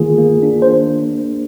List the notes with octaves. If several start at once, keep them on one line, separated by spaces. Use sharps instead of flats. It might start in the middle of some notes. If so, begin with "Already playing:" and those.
Already playing: D#3 A#3 F4 G#4
A#3
D4
C5